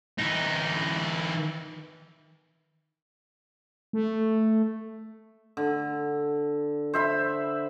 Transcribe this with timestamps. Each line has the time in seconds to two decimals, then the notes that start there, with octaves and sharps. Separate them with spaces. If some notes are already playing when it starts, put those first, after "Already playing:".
0.19 E3 D#4
3.93 A3
5.57 D3
6.94 C5 E5 B5